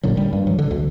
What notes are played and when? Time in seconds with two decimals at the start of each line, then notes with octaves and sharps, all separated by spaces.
0.03 A1 A#2 D3 F#3
0.17 G3
0.33 G2
0.47 E3 F#3
0.59 D3
0.71 D2